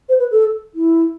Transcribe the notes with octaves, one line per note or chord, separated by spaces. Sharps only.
C5
B4
A4
E4